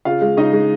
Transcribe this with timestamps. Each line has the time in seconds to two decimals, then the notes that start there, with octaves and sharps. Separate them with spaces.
0.05 C#3 F4 F5
0.22 G#3
0.37 C#3 D#4 D#5
0.53 G#3